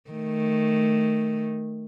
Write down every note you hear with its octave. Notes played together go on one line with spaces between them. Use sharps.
D#3 A3